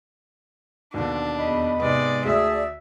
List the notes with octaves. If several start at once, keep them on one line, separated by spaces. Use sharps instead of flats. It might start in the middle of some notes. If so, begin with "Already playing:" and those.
D#2 B2 D3 D4
E2 D#5 B5
G#2 C3 G#3 B3 D5
D2 A3 G#4 D5 E5